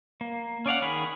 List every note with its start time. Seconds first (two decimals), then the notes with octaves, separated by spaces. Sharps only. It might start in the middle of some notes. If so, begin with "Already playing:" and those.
0.21 A#3
0.66 C#4 D5 F5 F#5
0.82 D#3 G#4 B5